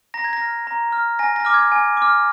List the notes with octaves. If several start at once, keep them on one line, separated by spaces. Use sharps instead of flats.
A#5 A#6
G#6
A#6
F6
A#5
F6
G#5 A#6
A#6
D6 F6
G#6
G#5
D6 F6